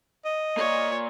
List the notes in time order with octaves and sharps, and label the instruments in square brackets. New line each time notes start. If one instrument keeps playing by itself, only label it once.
[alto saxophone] D#5
[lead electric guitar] A#3 D5 [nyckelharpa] C#5